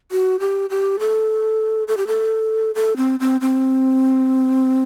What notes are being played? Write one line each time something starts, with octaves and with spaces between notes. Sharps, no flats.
F#4
G4
G4
A4
A4
G4
A4
A4
C4
C4
C4